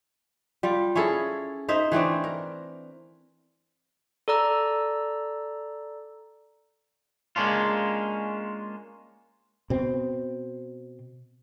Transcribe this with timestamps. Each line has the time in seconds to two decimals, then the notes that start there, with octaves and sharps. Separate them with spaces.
0.63 G3 F4
0.95 C#4 E4 G#4 A4
1.69 D#4 C5 E5
1.92 E3 A3 C4 D4
2.24 A#4
4.28 A4 D5 A#5 E6
7.36 G#3 A#3 C#4 D4 F4
9.70 B2 C4